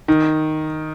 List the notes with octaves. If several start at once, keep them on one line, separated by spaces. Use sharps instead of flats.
D#3